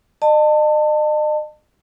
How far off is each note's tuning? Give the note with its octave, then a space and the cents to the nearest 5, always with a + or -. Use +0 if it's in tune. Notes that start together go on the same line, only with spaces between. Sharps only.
D#5 -40 A5 +25